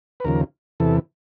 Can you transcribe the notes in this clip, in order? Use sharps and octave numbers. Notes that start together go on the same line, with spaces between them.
B4
D#2 C#3 F3 A#4
E2 C3 E3 A4